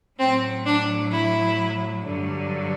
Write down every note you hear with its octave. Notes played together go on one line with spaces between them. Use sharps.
A2 F#3 C4
D4
E4
G2 D3 F#3